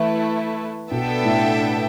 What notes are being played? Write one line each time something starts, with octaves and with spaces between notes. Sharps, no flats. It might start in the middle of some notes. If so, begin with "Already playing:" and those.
Already playing: E3 A3 E4 B4
B2 B3 D4 A4 E5 G5
A2